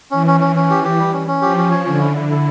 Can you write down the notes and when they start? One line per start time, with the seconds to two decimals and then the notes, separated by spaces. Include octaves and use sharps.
0.11 E3 C#4
0.27 C#4
0.40 C#4
0.56 C#4
0.70 G4
0.84 G4
0.99 G3
1.13 C#4
1.27 C#4
1.42 F3 G4
1.57 C#4
1.71 C#5
1.85 D3 C#4
2.00 E4
2.16 E4
2.30 E4